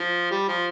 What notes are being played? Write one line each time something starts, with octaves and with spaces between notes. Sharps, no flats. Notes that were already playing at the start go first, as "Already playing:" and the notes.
Already playing: F3
G3
F3